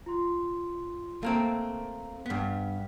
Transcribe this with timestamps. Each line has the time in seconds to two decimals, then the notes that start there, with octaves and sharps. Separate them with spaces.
0.06 F4 C6
1.23 A3 A#3 C4 F5 A#5
2.26 G2 B3 F6 B6